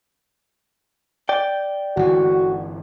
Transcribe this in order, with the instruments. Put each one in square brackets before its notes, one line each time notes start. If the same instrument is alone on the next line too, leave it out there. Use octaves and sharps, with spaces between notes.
[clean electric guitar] D5 G5
[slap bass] G1 E3 [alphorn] F#4